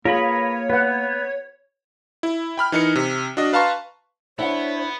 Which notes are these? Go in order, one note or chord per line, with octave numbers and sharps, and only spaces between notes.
A#3 F4 G#4 A#4 B4 C#5 B5
B3 B4 F#5
E4
G5 B5 F6
E3 D#4 A#4 C#7
C3
D4 F#4 D#5
B4 F5 A5 A#5 C6 C#6
B3 D4 E4 C5 C#5 E5 F#5